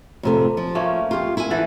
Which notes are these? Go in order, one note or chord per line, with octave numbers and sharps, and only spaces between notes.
F2 C3 A3
F3
A3 A#3 C#4
F4 G4
E4 G#5
E3 A4 F#5